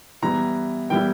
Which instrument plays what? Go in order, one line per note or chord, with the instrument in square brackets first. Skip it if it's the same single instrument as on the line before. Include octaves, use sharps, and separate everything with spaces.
[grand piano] E3 G3 B3 E4 A#5
E3 G3 B3 E4 G5